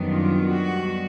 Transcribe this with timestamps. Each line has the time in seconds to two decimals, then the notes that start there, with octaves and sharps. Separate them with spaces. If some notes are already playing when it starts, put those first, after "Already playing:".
Already playing: F#2 D#3 G3 B3 D4
0.09 F4
0.50 F#4